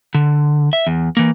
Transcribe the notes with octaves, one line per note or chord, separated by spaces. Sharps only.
D3
E5
E2
E3 A#3